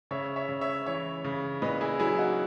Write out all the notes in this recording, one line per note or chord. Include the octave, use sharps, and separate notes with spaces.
C#3 C#5 E5
C#5 E5
C#3
C#5 E5
E3 C#5 E5
C#3
A#2 B4 D#5
E4 G#4
F#3 E4 G#4
D#4 F#4